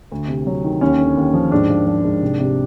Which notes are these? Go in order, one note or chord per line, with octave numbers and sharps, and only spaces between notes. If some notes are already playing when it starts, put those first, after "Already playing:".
D2
C3
F#3
D#3
D#2 C#4
D3
D#2
F3
G#2 D4
F3
F3
G#2
C2
C3